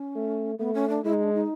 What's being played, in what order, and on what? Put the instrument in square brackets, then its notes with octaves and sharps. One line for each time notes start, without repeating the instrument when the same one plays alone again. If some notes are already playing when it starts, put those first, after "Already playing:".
Already playing: [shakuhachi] C#4
[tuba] A3
[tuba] A3 [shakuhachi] B3
[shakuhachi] C#4
D4
[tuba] G#3 [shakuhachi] E4
[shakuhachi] D#4
D4
D#4